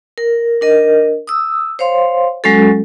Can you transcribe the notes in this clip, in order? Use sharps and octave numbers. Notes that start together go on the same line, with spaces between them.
A#4
D4 A#4 D#5
D#6 E6
C5 C#5 F5 C6
F#3 G#3 C#4 F#4 A4